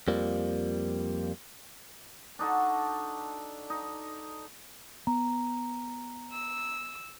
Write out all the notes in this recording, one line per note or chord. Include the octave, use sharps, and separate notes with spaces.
F2 F3 G3 A#3
D4 D#4 F#4 A4
D#4
B3 A#5
E6